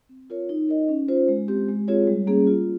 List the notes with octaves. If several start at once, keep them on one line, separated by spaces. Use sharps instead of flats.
C4
F4 A#4 C#5
D#4
A#4 D#5
C#4
F4 C5
G#3
C4 G4
G#3
C4 F4 G#4 C#5
G3
A#3 C#4 G#4
F4